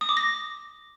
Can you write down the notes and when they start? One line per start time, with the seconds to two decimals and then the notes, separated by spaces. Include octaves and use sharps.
0.01 D#6
0.09 D6
0.17 A#6